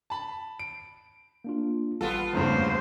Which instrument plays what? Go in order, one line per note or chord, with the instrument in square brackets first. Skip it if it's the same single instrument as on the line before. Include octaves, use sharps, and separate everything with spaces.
[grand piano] A5 B5
D7
[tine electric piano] A#3 D4 F4
[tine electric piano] A1 G3 [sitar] B3 F4 A4
[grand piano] E2 G2 C#3 [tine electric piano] A3 A#3 C4 [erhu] C5